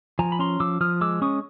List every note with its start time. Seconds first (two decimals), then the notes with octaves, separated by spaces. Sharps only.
0.19 F3 G#5 A#5
0.32 B5
0.39 C#4 A#5 C6
0.60 F3 D6 E6
0.81 F3 D#6 F6
1.01 G#3 D6 E6
1.22 C#4 C#6 D#6